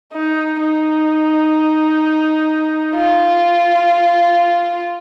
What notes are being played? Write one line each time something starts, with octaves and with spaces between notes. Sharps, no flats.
D#4
D#4
F4